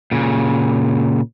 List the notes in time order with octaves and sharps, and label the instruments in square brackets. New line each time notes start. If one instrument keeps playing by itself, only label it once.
[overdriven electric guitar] A#2 C#3